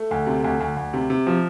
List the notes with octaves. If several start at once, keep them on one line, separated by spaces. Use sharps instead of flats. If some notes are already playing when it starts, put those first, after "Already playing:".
Already playing: A3
D2
C3
D2
D2
D2
C3
C3
F3